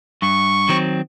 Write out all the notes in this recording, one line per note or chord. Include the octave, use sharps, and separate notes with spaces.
G2 C#6
D#3 F#3 C4